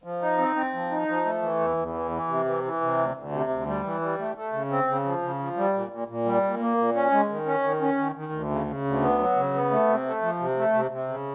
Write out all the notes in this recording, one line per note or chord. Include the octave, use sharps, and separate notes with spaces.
F3
D#4
C4
C4
F3
D#4
F3
A3
E3
E2
E2
E3
E3
C3
E3
E3
C3
D2
D2
C3
D2
G3
E3
G3
A3
A3
C#3
C4
C#3
F3
C#3
F3
G3
A#2
A#2
A#2
G3
A#2
A#3
A#2
C#4
G#3
D#3
C#4
D#3
C#4
D#3
D#3
D2
C#3
C#3
D2
B3
F#3
C#3
B3
A3
C3
A3
F3
C3
A3
C3
C3
C#3